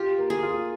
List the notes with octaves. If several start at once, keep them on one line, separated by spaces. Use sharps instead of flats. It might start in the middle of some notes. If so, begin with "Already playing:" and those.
Already playing: F4 G4
A#3
G#4
F4